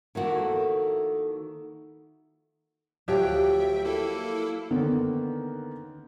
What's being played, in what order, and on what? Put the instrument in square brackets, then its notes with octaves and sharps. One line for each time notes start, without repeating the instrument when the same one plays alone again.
[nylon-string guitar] D#3 A#3 F#4 [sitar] F3 A3 E4
[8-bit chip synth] D2 E5 G5 [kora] F3 F#3 G4
[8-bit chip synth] A#3 E4 A4
[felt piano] D3 D#3 A#3 B3 C#4